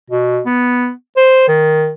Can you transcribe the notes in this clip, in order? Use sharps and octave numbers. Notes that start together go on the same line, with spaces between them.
B2
B3
C5
D#3